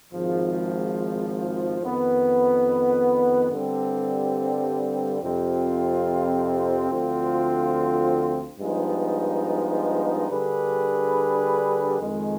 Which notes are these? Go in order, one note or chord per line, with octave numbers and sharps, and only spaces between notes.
G#1 G#2 F3
F2 D#3 B3
G2 D3 G3 C4
F2 C3 F3 C4 F4
D2 D3 F3 C4 F4
G2 F3 G#3 B3 D#4
D3 G3 D4 G#4 B4
F2 D#3 G#3